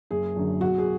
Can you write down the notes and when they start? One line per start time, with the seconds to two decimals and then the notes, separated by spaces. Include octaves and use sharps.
0.10 F#1 G#4
0.36 F#2 D3 F#3
0.61 B1 F#4
0.78 G#4